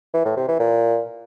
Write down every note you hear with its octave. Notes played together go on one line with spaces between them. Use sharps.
E3
A2
C3
E3
A#2